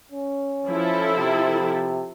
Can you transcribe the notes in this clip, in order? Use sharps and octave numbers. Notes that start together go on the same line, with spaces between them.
C#4
F3 E4 A4
C3